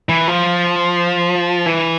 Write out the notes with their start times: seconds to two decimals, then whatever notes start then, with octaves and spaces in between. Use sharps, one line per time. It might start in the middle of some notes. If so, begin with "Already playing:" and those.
0.09 E3
0.28 F3
1.66 E3